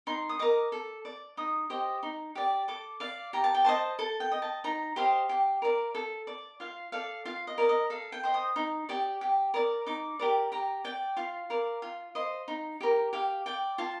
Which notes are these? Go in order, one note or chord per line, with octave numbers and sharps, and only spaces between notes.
D#4 C6
D#6
A#4 D#5 D6
A4
D5
D#4 D#6
G4 C5 D#5
D#4
G4 D5
A4 D6
D5 F5
G4 A#5
A5
G5
C5 D#5 A5
A4 A5
G5
D#5
A5
D#4 A#5
G4 C5 D#5 F5
G4
A#4 D5
A4
D5
F4 F5
A4 D5 F5
F4 F5
D#5
A#4 D5
D#5
A4 F5
G5
C5 D#5
D#6
D#4
G4 D5
G4
A#4 D5
D#4 D6
G4 A#4 D5
G4 A#5
D5 G5
F4 F5
A#4 D5
F4
C5 D#5
D#4
G4 A#4
G4 F5
D5 G5
F4 A5